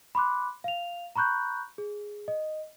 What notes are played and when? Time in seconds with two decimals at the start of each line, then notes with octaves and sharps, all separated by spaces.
0.15 B5 C6 D6 F#6
0.64 F5 F7
1.16 A#5 B5 C#6 F#6 G6
1.78 G#4
2.28 D#5